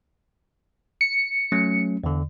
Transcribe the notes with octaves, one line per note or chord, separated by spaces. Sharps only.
C#7
F#3 A3 C#4
E2 D3